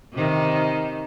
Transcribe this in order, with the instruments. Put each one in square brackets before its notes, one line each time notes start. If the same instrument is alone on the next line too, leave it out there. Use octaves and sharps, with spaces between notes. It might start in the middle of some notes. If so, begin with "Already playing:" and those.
[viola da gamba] C3 D#3